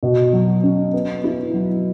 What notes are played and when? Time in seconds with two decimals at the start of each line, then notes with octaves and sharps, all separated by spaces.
0.03 B2
0.33 F#3
0.63 C#4
0.93 B3
1.24 E4
1.54 F#3